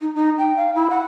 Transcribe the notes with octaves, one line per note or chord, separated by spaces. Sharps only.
D#4
D#4
G5
F5
E4
F#5